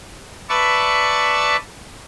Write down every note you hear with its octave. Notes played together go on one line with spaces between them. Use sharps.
B4 D5 E5 A5 C#6